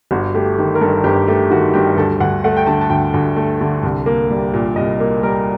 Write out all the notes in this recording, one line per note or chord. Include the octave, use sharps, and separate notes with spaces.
G1 F#4
A3 G4
D#3
A#4
G2 A4
G1 G4
A3 G4
D#3 F#4
G2 G4
D2 A4
D2 F#5
A3 F#5
G5
D3 A5
A5
D2 G5
D2
A3
D3
C2
A#3
G3
A#2
C2 D#5
A#3
G3 A#4